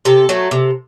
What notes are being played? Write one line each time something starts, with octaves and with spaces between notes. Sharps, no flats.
C3 A4
F#3 A3
C3